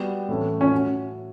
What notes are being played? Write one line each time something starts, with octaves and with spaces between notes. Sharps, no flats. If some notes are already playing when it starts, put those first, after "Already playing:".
Already playing: G3 B3 F#4
A2 E3 A3 C#4
C#4
F#4